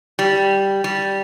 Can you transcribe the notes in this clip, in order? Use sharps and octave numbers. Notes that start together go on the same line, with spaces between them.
G3
G3